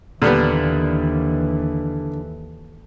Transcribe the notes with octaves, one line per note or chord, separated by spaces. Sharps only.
D#2 A#2 D3 E3 G3 B3